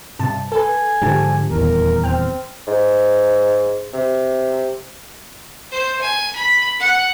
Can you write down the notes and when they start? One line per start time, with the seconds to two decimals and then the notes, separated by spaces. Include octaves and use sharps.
0.19 G2 C3 A5
0.52 A4 B4 G#5
1.02 G#2 D3 F3 G4 A5
1.51 D#1 E2 A#4
2.04 C4 G5 F6
2.67 G#2
3.94 C3
5.72 C5
6.02 G#5
6.36 B5
6.80 F#5